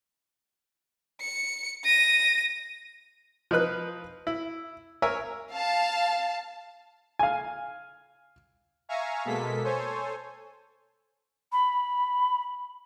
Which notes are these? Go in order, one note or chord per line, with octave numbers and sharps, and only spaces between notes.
C#7
A#6 D#7
F3 D#4 B4 F#6
E4
A#4 C#5 E5 G#5
F5 A5
F5 G#5
E5 F5 G#5 A#5 C#6
B2 G#3 A#3 A4 B6
A4 C5 C#5 G#5
B5